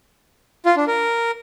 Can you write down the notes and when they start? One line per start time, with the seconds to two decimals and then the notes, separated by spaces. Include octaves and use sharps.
0.66 F4
0.77 D4
0.87 A#4